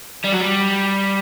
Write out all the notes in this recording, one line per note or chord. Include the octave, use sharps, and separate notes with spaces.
G3
F#3
G3